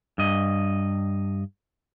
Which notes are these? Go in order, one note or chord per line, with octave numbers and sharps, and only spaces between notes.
G2 D#5